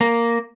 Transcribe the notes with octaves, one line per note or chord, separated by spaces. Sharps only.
A#3